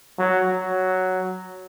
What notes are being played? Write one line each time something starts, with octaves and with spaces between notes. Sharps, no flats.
F#3
F#3